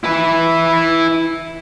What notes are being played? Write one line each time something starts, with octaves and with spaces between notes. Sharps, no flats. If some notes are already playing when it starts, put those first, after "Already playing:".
E4 B4